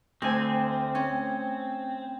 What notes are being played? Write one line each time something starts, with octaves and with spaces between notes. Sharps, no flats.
D2 C4 G#5
C#4